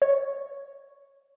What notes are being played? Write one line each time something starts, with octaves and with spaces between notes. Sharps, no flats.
C#5